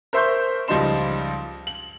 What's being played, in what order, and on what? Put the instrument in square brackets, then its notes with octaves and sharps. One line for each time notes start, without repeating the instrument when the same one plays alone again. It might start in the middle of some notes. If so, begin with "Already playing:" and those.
[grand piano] A#4 C5 E5 C6 C#6 G6
C#2 F3 G3 D#4 C6 E7
F#7